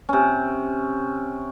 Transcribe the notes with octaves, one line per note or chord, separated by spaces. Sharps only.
C3 C#4